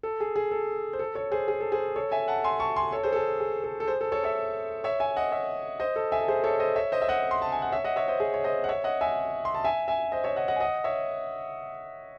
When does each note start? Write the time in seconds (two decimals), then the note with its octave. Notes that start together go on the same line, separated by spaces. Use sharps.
0.03 A4
0.20 G#4
0.36 G#4
0.51 A4
0.93 C5
0.99 A4
1.15 A4 C#5
1.32 G#4 C5
1.48 G#4
1.61 A4
1.72 G#4 C5
1.96 A4 C#5
2.12 E5 G#5
2.28 F#5 A5
2.44 G#5 C6
2.60 A5 C#6
2.76 G#5 C6
2.92 A4 C#5
3.03 G#4 C5
3.13 A4
3.16 G#4
3.40 G#4
3.64 A4
3.80 A4
3.87 G#4 C5
4.01 A4
4.12 A4 C#5
4.24 C#5 E5
4.84 C#5 E5
5.00 E5 G#5
5.16 D#5 F#5
5.32 C#5 E5
5.80 C5 D#5
5.96 A4
6.12 E5 G#5
6.21 A4
6.28 G#4 C5
6.44 A4 C#5
6.60 C5 D#5
6.76 C#5 E5
6.92 C5 D#5
7.02 E5
7.08 D#5 F#5
7.31 C6
7.42 A5
7.52 G#5
7.62 F#5
7.72 C#5 E5
7.84 D#5 F#5
7.96 C#5 E5
8.08 C5 D#5
8.20 G#4
8.34 C#5
8.44 C5 D#5
8.64 F#5
8.69 C#5 E5
8.84 D#5 F#5
9.01 E5 G#5
9.45 C6
9.54 A5
9.64 E5 G#5
9.88 E5 G#5
10.12 C5 D#5
10.24 C#5 E5
10.36 D#5 F#5
10.48 D#5 F#5
10.56 G#5
10.60 D#5 F#5
10.84 C#5 E5